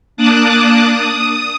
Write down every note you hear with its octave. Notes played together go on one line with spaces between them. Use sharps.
A#3 D4 A5 D6 D#6 F#6
D#6